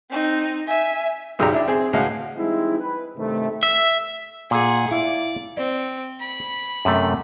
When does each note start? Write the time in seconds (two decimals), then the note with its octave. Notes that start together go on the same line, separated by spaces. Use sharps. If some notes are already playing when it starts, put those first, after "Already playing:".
0.11 C4 D#4
0.67 E5 G#5
1.39 B1 F#2 C#3 G4 D5 A#5
1.52 D4 E4
1.68 C4 G#4
1.93 C#2 A2 G#3 F#4 F5
2.36 E3 G3 G#3 C4 D#4 E4
2.79 B4
3.17 G2 C3 D#3 A3
3.63 E5
4.51 A#2 G#4 F#5
4.91 E4 D5 F5
5.57 C4 D5
6.21 B5
6.85 F#2 C3 A3